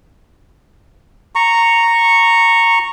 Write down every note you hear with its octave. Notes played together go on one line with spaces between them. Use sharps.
A#5 C#6